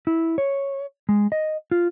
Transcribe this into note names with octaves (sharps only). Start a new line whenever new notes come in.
E4
C#5
G#3
D#5
F4